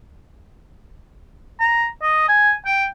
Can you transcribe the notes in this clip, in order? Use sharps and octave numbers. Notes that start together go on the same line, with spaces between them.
A#5
D#5
G#5
G5